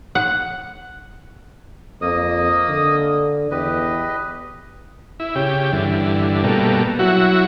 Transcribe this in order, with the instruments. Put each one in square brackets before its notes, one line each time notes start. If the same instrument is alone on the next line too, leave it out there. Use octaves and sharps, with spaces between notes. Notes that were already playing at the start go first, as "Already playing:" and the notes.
[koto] F#5
[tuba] F2 [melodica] A#3 D#5 D#6
[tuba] D3
[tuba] E2 [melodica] G4 B4 D#5
[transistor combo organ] E4
C#3 G4
G2 D3 E3
B2 G3 A3 A#3
F#3 E4 F#4